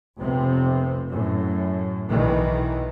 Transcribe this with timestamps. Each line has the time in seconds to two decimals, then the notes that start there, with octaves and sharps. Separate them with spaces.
0.19 F1 C3 B3 C4
1.09 F#2 A2
2.10 B1 B2 D#3 E3